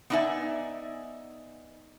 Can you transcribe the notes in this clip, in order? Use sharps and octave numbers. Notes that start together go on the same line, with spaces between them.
B3 D4 D#4 D5 E5 G#5